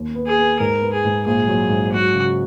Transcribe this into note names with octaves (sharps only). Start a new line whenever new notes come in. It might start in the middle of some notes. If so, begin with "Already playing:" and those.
Already playing: D#2
B3
G#4
B3
G#2 A#4
B3
G#4
G#2
A#1 G#4
F#3
G#2
F#3 F#4
C#3